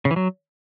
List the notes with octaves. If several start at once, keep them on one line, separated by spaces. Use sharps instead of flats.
C#3
E3
F#3